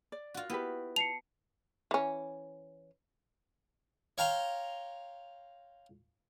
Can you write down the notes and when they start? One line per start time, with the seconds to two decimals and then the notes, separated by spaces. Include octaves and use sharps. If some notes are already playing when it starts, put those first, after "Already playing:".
0.12 D5
0.34 F4 F#4
0.50 B3 E4 G4 B4
0.96 A5 C7 C#7 F7
1.91 E3 C#4
4.18 C#5 F5 G5 A#5 C6